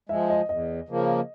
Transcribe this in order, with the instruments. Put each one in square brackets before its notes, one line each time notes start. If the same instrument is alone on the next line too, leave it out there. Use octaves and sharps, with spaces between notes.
[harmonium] F3 G#3 [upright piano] E5
[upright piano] D#5
[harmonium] E2 [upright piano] D#5
[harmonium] C#3 F3 A#3